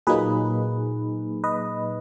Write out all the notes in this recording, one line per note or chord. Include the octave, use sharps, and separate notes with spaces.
A#2 F#3 A#3 D#4 G#4 B4
B4 D#5